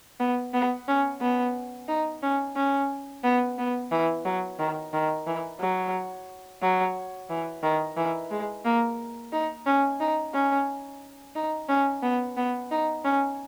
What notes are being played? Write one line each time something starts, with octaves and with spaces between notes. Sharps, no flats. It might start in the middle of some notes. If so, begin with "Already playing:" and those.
B3
B3
C#4
B3
D#4
C#4
C#4
B3
B3
E3
F#3
D#3
D#3
E3
F#3
F#3
E3
D#3
E3
G#3
A#3
D#4
C#4
D#4
C#4
D#4
C#4
B3
B3
D#4
C#4